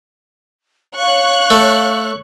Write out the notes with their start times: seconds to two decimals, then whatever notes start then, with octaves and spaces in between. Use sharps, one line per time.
0.97 C#5 F5 C#6 F#6
1.50 A3